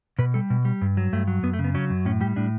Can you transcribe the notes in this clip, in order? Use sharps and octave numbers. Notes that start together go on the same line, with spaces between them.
B2 B4
G3 A4
B2
G3
G2
F#3
G2 A3
F#3
F#2 B3
A3
C#3
B3
F#3 C#4
F#2
A2 C#4
G3 G4
A2 D4